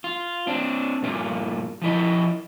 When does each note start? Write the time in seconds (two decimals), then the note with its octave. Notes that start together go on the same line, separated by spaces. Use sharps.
0.04 F4
0.47 C4 D4
1.02 G2 A#2 A#3 F4
1.82 F3 E4 D#5